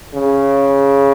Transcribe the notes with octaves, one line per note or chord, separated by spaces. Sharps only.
C#3